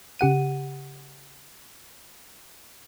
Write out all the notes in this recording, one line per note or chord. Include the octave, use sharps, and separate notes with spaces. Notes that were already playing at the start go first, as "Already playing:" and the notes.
C#3 G4 F#5 D#7